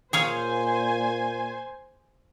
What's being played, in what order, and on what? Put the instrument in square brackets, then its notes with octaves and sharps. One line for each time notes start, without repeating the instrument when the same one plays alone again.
[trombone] A#2 [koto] G#4 C#5 F5 [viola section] C5 G#5